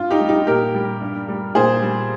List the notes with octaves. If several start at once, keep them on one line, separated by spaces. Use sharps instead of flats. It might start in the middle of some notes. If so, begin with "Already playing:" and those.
Already playing: G2 F4
D#4 G4
G3
D#4 G4
A#2 G4 A#4
G3
G2
G3
A#2 G#4 C5
G3